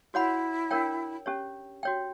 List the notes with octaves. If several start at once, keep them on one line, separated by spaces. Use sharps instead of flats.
E4 F#4 C#5 F#5 B5
D4 A#4 C#5 G5
C#4 G4 C#5
F#4 C#5 G5